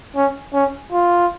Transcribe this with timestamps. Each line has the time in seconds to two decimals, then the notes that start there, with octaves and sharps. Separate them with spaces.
0.16 C#4
0.54 C#4
0.92 F4